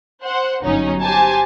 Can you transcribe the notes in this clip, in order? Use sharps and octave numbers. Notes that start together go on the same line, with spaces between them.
C5 F#5
G1 F#3 C#4 D#4
G4 C5 G#5 A5